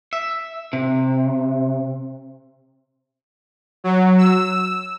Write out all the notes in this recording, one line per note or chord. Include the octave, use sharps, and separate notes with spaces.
E5
C3
F#3
E6